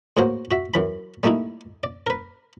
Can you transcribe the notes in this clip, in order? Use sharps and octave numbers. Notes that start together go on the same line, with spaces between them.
E2 A2 A#3 F#4 C5
F#4 E5
F#2 E3 B5
G3 A3 A#3 D#4 E4
D5
A#4 B4